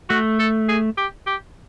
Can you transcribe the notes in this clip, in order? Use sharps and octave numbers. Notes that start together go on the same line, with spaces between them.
A3 F#4
A4
G#4
G4
G4